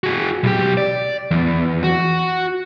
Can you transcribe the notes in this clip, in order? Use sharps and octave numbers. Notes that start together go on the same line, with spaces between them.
F#4 G#4
B1 G4
D5
E2
F#4